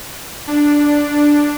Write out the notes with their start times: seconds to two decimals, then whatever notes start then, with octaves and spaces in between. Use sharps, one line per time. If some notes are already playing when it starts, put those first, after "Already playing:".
0.47 D4
0.95 D4